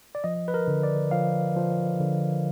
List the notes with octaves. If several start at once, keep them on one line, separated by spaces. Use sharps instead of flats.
D5
F3 D#5
B4
A#4
D3
D5
F3 F5
F3
D3